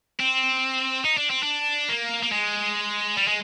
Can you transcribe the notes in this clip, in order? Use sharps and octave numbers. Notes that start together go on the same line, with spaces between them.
C4
D#4
D4
C4
D4
A#3
A#3
G#3
G3
G#3